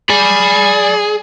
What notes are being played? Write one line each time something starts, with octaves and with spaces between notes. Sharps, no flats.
G#4 D5 B5